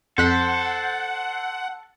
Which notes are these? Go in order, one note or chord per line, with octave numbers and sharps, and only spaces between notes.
F2 A4 C5 F#5 F#6 B6